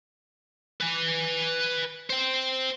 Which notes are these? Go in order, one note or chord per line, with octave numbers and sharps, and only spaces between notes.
B4 G#5
C5 G5